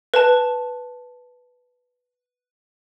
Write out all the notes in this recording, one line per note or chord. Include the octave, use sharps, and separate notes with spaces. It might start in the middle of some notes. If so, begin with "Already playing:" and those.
B4 A5